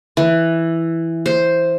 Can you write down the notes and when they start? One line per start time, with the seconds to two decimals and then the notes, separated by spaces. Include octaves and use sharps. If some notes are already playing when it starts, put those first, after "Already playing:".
0.17 E3
1.26 C5